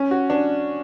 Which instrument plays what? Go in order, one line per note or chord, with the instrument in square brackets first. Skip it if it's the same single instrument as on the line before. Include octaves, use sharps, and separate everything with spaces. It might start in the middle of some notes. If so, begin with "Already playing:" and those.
Already playing: [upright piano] C#4
F#4
D4